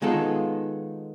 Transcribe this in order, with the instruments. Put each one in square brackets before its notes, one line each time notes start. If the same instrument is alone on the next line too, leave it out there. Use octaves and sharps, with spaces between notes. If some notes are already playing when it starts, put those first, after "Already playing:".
[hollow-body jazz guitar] D#3 G#3 B3 F4 A4